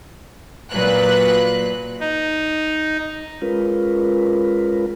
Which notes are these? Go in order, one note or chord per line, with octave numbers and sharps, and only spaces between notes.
A#2 F#3 B4 F#6
D#4
G#3 C#4 F4 A#4 B4